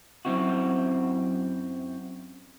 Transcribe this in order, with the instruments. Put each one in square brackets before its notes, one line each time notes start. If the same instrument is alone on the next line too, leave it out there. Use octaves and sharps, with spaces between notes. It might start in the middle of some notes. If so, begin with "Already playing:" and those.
[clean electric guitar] F#2 C4 E4 F#4